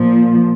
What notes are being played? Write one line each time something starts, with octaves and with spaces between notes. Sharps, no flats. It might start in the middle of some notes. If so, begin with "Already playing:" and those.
Already playing: A#2 F3